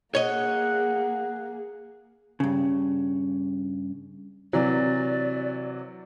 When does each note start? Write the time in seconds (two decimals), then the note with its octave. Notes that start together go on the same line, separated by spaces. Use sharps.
0.15 A#3 G#4 C#5 D#5 F#5
2.40 G2 C#3
4.53 C3 E3 F#3 D5